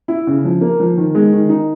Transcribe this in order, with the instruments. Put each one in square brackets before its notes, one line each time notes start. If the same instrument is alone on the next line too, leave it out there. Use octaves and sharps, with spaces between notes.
[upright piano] E4
C#3
F3
A#3
F3
D#3
G#3
D#3
D#4